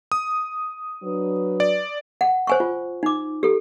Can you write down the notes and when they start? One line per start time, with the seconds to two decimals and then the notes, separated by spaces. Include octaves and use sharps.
0.12 D#6
1.03 F#3 D4 B4
1.60 D5
2.21 F#5
2.47 C5 G#5 C#6
2.60 F4
3.03 D#4 D6
3.43 G4 A4